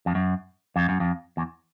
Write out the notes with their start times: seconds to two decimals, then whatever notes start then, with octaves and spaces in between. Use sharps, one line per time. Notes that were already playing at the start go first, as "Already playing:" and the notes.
0.06 F2
0.15 F#2
0.76 F2
0.89 F#2
1.00 F2
1.37 E2